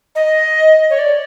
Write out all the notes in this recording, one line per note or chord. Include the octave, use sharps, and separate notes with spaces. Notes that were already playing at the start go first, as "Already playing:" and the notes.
D#5
C#5
D5